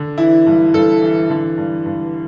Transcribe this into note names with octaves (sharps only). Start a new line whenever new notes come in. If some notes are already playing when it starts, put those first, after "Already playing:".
Already playing: D3
E3 E4
G2
G2 A4
E3
D3
G2
G2